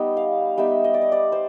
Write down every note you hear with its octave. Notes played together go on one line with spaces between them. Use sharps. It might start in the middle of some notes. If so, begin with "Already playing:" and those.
Already playing: G3 B3 D#4
F5
G3 B3 D#4 E5
D#5
D5
D#5
D5
C5